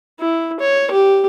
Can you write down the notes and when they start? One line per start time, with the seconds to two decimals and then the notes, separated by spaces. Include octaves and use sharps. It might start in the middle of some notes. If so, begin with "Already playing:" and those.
0.20 E4
0.60 C#5
0.91 G4